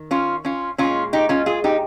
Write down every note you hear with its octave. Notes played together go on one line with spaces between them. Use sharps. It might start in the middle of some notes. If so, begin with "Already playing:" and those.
Already playing: D#3
C#4 F4
C#4 F4
A#2 G#3 C#4 F4
D#4 G4
C#4 F4
F4 G#4
D#4 G4